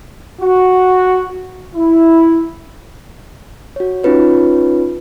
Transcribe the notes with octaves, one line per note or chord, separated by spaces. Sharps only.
F#4
E4
F#4 C#5
C#4 D#4 F4 B4 C#5